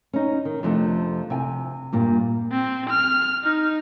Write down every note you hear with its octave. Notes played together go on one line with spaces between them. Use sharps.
C#4 D#4
D#3
F2 C3 F3 A3 C4 D4
C3 G5 G#5
G2 A#2 G3
C4
F6
D#4